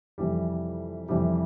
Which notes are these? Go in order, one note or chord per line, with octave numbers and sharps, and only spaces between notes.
F2 C3 E3 G3
F2 C3 E3 G3